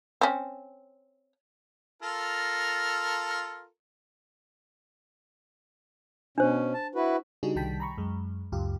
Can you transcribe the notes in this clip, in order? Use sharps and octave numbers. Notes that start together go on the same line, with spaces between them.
C4 C#4
F4 A4 A#4
B2 C#4 D4 C5
A5
E4 F#4 B4
C#3 G3 D4 D#4 F#4 G#4
C2 D#3 G3 G5 A5 B6
A#5 B5 C#6
F#2 G#3
C#2 F#2 F4 G4